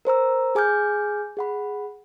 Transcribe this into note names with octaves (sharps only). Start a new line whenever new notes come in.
A#4 C5 A#5 E6
G#4 G#5 D6 F6 G6
G#4 F#5 B5